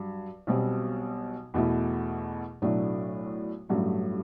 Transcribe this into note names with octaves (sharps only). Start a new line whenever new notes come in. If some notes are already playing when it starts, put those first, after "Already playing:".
Already playing: G2 F#3
B1 B2 G3 C4
E2 B2 A3 E4
B1 A2 F#3 A3 D4
A1 G2 F#3 A3